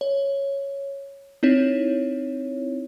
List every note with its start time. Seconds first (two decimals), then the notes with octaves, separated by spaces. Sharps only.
0.01 C#5
1.43 C4 D#4 E4 C#5